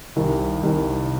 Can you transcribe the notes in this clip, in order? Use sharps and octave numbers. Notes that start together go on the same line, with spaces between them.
C2 C3 D#3
C2 C3 D#3